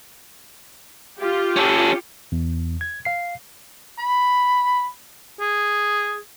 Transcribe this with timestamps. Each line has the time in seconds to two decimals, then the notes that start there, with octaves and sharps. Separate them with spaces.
1.18 F4 G4
1.57 C#4 A4
2.32 E2
2.81 G#6
3.05 F5 C7
3.98 B5
5.41 G#4